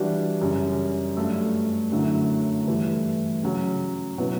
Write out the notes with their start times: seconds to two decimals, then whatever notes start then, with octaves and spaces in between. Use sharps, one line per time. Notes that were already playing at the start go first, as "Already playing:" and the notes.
Already playing: E3 G3 D4 F#4
0.41 F#2 C#3 G3
1.17 G2 F#3 A3
1.91 F#2 D3 F#3 A3 E4
2.67 G2 E3 A3 E4
3.43 C#3 F#3 C#4
4.18 B2 F#3 B3 E4